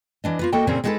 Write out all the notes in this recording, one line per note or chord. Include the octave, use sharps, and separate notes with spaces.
E3 D4 D#5
A#3 F4 B4
A#3 F#4 A4 D#5 G5 A5
A#2 C#3 A#3 C4 C#4
G#3 D#4 F#4 G#4 A4 B4